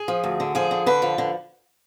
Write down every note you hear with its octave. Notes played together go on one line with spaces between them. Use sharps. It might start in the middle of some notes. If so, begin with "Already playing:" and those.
Already playing: G#4
F3
D2
D3
F3 G#4
D3
D3 B4
F3
D3